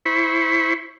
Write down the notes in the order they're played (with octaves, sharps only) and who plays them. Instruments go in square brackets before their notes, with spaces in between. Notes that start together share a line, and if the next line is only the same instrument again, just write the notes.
[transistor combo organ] E4 C5 B5 C#6